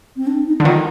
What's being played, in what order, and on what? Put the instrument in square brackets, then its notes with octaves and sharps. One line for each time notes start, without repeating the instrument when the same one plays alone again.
[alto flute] C4
D4
D#4
[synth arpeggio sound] D3
[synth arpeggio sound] D#3 [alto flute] F4